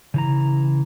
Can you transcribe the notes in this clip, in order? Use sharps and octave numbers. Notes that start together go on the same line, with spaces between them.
C#3 E3 A#5